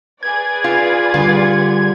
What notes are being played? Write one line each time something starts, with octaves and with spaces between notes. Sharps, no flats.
G#4 B4 D5 G#6
F4
D3 G3 F4